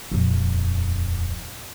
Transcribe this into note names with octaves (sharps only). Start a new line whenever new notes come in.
D#1 F2